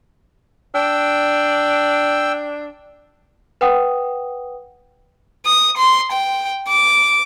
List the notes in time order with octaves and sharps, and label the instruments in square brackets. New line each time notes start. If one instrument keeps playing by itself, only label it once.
[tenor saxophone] D4 [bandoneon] G5 E6
[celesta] B4 F#5 G5 D#6
[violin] D#6
C6
G5
D6